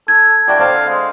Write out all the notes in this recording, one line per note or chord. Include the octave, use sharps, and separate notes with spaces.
A4 G#6
D4 E4 F#4 G5
D3 C4 A4 F5
G#3